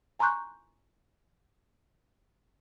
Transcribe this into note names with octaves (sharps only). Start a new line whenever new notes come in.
G#5 A#5 C6 C#6 F#6 G6